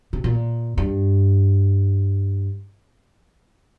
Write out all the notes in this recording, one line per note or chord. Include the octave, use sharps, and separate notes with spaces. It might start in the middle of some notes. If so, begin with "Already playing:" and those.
C3
A#2
G2